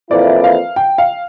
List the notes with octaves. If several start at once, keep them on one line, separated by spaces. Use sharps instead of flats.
F2 E3 A#3 E4 D5
F5
G5
F5